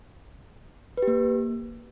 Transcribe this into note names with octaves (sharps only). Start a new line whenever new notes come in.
B4
G4
A#3